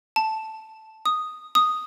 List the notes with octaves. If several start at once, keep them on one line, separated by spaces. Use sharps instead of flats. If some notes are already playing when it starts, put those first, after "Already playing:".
A5
D#6
D#6